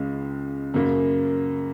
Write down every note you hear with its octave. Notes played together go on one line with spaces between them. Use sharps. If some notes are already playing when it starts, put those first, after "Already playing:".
Already playing: C#2 C#3 G#3
F#2 C#3 A#3